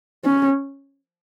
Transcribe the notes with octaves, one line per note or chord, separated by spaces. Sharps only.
C#4